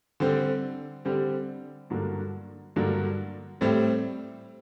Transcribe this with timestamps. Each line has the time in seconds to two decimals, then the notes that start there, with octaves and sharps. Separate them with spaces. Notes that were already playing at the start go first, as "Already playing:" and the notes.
0.20 D3 G3 C4 G4
1.05 D3 G3 C4 G4
1.90 G2 D3 F#3 A#3 D4
2.76 G2 D3 F#3 A#3 D4
3.61 A2 G3 C4 G4